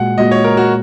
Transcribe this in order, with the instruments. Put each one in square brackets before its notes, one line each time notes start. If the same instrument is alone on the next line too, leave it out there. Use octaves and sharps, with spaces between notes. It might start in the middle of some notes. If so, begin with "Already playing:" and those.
Already playing: [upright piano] A#2 G#3 F#4 [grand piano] F#5
[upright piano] A#2 G#3 F#4 [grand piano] D#5
[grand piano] C#5
A#4
F#4